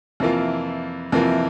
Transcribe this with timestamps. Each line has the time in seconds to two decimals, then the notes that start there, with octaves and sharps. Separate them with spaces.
0.20 F2 C3 E3 A#3 F4
1.12 F2 C3 E3 A#3 F4